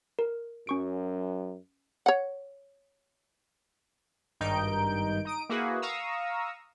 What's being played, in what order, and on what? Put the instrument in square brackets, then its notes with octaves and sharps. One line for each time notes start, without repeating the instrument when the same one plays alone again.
[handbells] A#4
[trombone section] F#2 [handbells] C#4 C#6 D7
[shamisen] C#5 F#5
[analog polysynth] G#1 G2 D#3 D#4 G6 D7
D#4 D#6 D7
A#3 E4 F#4 G#4 B4
F5 A#5 C#6 D#6 E6